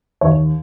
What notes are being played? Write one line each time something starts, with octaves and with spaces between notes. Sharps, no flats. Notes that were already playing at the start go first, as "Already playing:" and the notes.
D#2 C#5